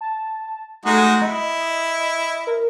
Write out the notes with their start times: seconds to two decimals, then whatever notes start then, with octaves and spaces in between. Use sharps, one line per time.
0.01 A5
0.85 G#3 A3 D#4 F#4
1.22 E4 D#5
2.47 A#4